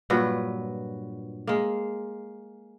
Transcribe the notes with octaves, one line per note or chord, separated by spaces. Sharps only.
G2 A#2 F#3 B4
G#3 A#3